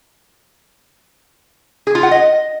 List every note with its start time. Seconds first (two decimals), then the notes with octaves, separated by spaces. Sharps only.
1.87 G#4
1.95 F4
2.03 F#5
2.11 D#5